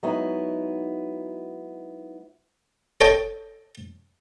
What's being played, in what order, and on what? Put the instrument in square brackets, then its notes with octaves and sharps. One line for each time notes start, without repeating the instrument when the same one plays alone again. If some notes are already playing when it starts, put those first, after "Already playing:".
[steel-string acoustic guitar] F#3 G#3 B3 D#4 E4 F#4
[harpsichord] A4 C#5 D#5 G5 G#5